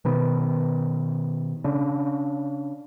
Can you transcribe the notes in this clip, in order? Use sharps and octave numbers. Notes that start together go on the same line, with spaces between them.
B2 D#3 B3
C#3 D4